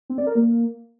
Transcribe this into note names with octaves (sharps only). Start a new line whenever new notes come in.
C4
D5
A#4
A#3